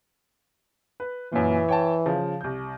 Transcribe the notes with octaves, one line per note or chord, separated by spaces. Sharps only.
B4
F#2 A#2 E3
C#5 G5 A5
C#3 F3
C2 G6